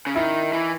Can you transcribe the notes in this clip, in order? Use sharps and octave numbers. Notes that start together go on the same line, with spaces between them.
C#3
D#3 E4
E3